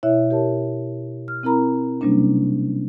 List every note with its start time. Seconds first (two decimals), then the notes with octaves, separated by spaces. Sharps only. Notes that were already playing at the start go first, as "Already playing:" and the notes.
0.03 B2 E4 C#5 E5 F#6
0.31 G4 A#4 C#5 A5
1.28 F6
1.43 C4 E4 A#4 A#5 B5
2.01 C3 F#3 G3 A#3 C#4 D4